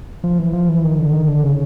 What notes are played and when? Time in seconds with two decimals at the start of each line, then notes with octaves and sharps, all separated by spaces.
0.24 F3
0.38 E3
0.53 F3
0.69 E3
0.84 D#3
0.98 D3
1.13 D#3
1.28 D3
1.43 C#3